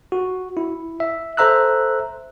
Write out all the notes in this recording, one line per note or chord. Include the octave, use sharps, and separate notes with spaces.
F#4
E4
E5
A4 C5 E5 A#5 E6 F#6